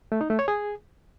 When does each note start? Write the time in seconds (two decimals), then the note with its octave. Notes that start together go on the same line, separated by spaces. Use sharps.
0.12 A3
0.21 D#4
0.30 A3
0.39 C#5
0.48 G#4